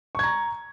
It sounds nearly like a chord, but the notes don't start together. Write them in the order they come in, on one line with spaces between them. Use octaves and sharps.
C#6 G#6 A#5